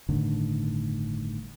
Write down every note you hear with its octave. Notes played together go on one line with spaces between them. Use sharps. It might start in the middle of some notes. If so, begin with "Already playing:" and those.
G1 A2 D3 D#3